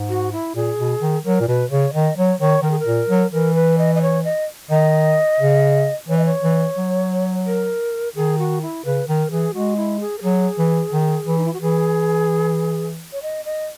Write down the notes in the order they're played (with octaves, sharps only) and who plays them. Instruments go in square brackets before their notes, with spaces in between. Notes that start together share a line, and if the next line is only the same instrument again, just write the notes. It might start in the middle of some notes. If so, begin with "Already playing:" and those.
Already playing: [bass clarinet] G#2
[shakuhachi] F#4
E4
[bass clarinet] A#2 [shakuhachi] G#4
[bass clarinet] B2
D#3
[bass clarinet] F#3 [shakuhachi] A#4
[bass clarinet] A#2
[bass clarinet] B2 [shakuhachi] B4
[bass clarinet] C#3 [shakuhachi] C#5
[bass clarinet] D#3 [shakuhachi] D#5
[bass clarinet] F#3 [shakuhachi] C#5
[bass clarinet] D#3 [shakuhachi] C#5
[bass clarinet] D#3 [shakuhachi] A#4
[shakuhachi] G#4
A#4
[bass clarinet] A#2
F#3
[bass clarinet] E3 [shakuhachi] A#4
[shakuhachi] B4
D#5
D#5
C#5
D#5
[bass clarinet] D#3 [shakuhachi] D#5
[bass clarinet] C#3
[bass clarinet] E3 [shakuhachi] C#5
[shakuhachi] D#5
C#5
[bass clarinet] E3
F#3
[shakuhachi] A#4
[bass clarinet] D#3 [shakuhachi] G#4
[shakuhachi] F#4
E4
[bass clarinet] C#3 [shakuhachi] B4
[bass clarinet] D#3 [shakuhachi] A#4
[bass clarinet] E3 [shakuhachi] G#4
[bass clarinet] G#3 [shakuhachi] F#4
[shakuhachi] E4
G#4
A#4
[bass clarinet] F#3 [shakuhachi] G#4
[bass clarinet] E3
D#3
E3
[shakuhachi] D#4
E4
F#4
[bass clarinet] E3 [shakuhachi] G#4
[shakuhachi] C#5
D#5
D#5